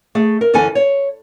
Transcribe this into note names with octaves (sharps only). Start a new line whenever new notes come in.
A3 G#4
A#4
F#2 D3 E3 A4 G#5
C#5